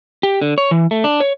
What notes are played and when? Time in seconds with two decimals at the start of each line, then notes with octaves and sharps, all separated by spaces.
0.23 G4
0.41 D3
0.58 C#5
0.71 E3
0.91 A3
1.04 D4
1.20 C#5